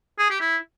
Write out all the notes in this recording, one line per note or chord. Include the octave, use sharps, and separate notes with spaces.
G#4
G4
E4